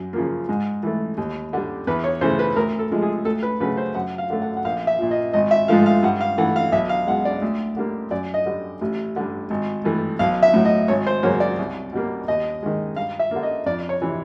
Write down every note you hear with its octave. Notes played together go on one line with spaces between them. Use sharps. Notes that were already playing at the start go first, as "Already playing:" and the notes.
Already playing: F#2
C#3 F3 A#3
G#2
E3 A3
D#2
D3 G3
E2 B4
C#5
C#3 E3 A3 C5
B4
D2 A#4
A4
C3 F3 G#3
G#4
D2 A4
B4
C#3 F#3 A3 B4
C5
F#2 F#5
F5
D3 F#3 A3
F#5
F#5
A#1 F5
E5
A#2 F3
D#5
G#1 D#5
E5
G#2 F3 A3 F5
F5
G2 F#5
F5
E3 A3 F#5
F5
B1 E5
F5
B2 G#3 F#5
D5
D2
D3 G3 A#3
F#2 D5
D#5
D3 G3
A1
G2 D3
G#1
G2 E3 A3
B1 F5
E5
A2 F#3
D#5
G#1 C#5
C5
F#2 C#3 F#3 A#3 C#5
D5
C2
B2 G3 A#3
D#2 D#5
D#3 G#3
G2 F5
E5
D3 G3 A#3
D#5
F2 D5
C#5
C3 E3